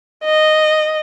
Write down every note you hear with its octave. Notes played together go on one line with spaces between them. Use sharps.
D#5